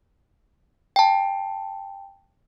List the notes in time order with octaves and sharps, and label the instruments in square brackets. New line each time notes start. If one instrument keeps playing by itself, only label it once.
[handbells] G5 A5